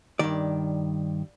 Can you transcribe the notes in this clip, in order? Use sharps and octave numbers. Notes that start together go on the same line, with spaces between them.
G2 D#3 D5